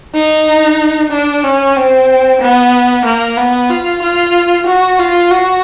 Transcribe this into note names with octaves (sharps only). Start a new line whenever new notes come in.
D#4
D4
C#4
C4
B3
A#3
B3
F4
F4
F#4
F4
F#4